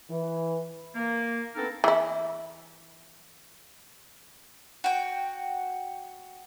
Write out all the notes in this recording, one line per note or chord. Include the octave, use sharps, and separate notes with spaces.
E3
A#3
B3 C4 D4 D#4 A4 A#4
E3 E4
F#4 G5